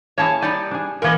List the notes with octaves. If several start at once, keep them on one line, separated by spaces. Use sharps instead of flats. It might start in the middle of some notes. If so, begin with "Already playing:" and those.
A#3 E4 G#4 C#5 A5
G3 D#4 G4 D5
D4 G#4
A#2 E3 A#3 A#4 D#5